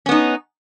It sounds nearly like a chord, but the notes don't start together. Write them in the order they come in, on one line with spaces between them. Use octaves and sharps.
C#4 B3 D#4